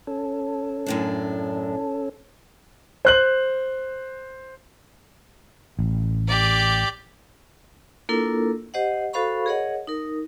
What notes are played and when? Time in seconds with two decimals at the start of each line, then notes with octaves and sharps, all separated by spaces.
0.07 C#4 A4
0.86 F#2 A2 D4
3.05 C5 F#6 F#7
5.79 A1
6.27 G4 D5
8.09 A#3 D4 E4 F4 A4 A#4
8.74 G4 C5 D#5 F#5
9.13 F#4 A4 C5 F5 B5 C#6
9.46 G#4 A#4 C#5 D#5 F#5
9.87 D#4 A#4